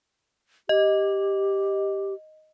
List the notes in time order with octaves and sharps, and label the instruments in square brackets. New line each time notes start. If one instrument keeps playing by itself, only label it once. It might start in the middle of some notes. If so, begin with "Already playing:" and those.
[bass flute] G4 [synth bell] D#5